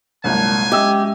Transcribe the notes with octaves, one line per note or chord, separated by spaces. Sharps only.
G1 C2 A#2 F#3 G#3 G#5 A5
G#3 C#4 G4 D#5 E5 E6